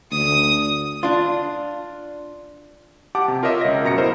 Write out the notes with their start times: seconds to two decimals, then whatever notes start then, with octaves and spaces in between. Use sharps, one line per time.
0.11 D2 D#6
1.03 D4 F4
3.15 G4 F#5 A5 D6
3.28 C3
3.43 F4 A#4 C#5 D#5 E5
3.61 C#2 A#6
3.83 F#2 B2 A#5 A#6 C#7
3.98 E4 A#4 C5 D#5